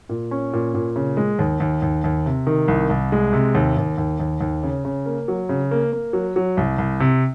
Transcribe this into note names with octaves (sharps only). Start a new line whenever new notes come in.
A#2
C#4
A#2
A#2
C#3
G#3
D#2
D#2
D#2
D#2
C3
D#3
C2
C2
G#3
C3
D#2
D#2
D#2
D#2
D#2
C#3
C#3
A#3
F#3
C#3
A#3
A#3
F#3
F#3
C2
C2
C3